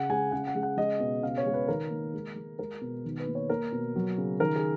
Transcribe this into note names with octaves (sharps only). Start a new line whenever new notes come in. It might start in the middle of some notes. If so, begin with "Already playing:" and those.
Already playing: C#3 F#5
G#3 G#5
C#3 F#5
F#5
G#3
F#5
G#3 D#5
B2
C#3 F5
C#5
G#3
B4
D#3 A#4
A#3
G#3
G#3
G#3 A#4
B2
D#3
B4
A#3
C#5
A#3 A#4
B2
F#3
C#3
D#3 A#4
G#4